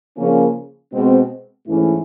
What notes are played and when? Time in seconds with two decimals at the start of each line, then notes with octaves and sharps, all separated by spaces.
0.17 C#3 F3 A#3 C#4
0.93 B2 G#3 C4
1.67 G#2 E3 A3 C#4 E4